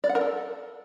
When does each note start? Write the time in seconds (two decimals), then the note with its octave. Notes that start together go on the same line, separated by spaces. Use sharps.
0.04 D5
0.09 F#5
0.15 A#4
0.21 A4